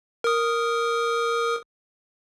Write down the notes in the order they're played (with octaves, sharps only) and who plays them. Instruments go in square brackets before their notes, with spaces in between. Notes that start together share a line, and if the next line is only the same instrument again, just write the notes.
[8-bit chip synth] A#4 D#6